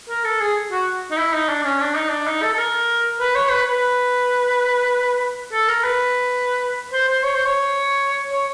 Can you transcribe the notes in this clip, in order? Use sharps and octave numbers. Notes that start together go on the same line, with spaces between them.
A#4
A4
G#4
F#4
D#4
E4
D#4
D4
C#4
D4
D#4
D4
D#4
A4
A4
A#4
B4
C#5
B4
B4
A4
A#4
B4
C5
C5
C#5
C5
C#5
C#5